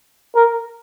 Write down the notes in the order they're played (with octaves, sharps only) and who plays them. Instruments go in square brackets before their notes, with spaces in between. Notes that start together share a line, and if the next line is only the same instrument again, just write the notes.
[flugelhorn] A#4